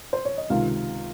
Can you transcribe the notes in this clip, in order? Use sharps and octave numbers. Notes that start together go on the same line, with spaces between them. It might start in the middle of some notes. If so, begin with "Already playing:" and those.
C5
C#5
D#5
C#2 C3 D#3 F4 F5